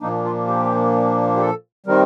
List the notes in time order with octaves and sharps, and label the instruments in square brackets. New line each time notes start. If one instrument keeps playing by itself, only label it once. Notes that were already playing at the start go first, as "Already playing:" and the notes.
[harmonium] A#2 F3 A#3 D4 D#4
F4
G4
G4
A4
C3 D#3 G3 C4 A#4